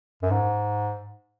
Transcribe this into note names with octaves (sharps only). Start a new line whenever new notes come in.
F#2
G#2